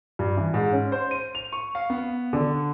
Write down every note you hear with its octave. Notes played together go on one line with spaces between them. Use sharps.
G2
E3
G#2
C#4
C5
D#7
F7
C#6
F5
B3
D3